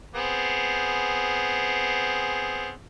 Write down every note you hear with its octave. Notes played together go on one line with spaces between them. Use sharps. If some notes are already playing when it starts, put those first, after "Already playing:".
B3 C4 G#4